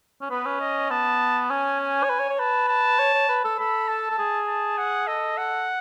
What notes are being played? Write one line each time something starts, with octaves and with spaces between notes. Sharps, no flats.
C#4
B3 B4
C#4
D#5
B3 A5
C#4 G#5
G#5
C#5
B4
C#5
C#5
B4 A5
A5
C#5
C#5
B4
A4
A4 B5
A5
A4
G#4
A5
F#5
A4 D#5
F#5